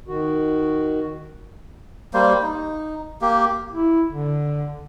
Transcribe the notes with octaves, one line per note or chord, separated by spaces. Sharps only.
D#3 F#4
G3 A#3 C5
D#4
A#3 G4
E4
D3